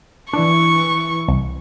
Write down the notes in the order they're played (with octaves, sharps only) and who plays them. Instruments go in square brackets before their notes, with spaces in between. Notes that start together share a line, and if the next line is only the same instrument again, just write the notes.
[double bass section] E3 [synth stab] D4 [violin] C#6
[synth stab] C2